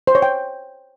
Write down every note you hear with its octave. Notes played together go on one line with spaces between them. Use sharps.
C5
C#5
G5